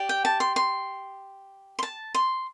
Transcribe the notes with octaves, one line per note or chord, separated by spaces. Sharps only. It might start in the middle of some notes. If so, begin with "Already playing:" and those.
Already playing: G4 D5
G5
A5
C6
C6
C6
A5
C6